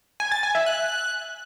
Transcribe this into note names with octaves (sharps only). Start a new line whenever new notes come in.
G#5
A6
G#5
E5
F#6